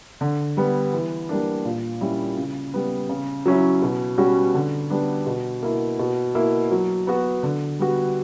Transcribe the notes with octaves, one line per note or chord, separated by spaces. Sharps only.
D3
G3 B3
E3
G3 A#3 D4
A#2
G3 C#4 E4
C#3
G3 B3
C#3
F#3 C#4 E4
B2
G3 C#4 F#4
D3
G3 B3 D4
B2
A#3 E4
B2
A#3 E4
F#3
B3 F#4
D3
G3 B3 F#4